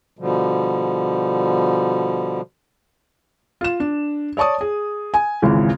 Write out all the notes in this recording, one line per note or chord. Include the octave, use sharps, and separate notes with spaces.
B2 D3 F3 G3
F4 E7
D4
C#5 D5 A5 C#6 D#6
G#4
G#5
G#1 C#2 C#3 E3